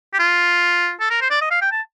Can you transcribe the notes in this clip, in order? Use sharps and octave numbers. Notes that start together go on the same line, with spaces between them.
G4
F4
A4
A#4
C5
D5
D#5
F5
G5
A5